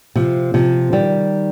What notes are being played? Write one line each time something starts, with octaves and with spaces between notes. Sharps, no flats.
C3 F3
C3 F3
D#3 G3